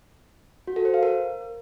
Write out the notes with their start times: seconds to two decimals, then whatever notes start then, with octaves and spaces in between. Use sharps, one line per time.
0.67 F#4
0.76 A4
0.85 C5
0.94 F5
1.03 A#4